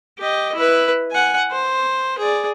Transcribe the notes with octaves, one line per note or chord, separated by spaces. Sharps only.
G4 D#5
E4 B4
F#5 G#5
C5
G#4 D5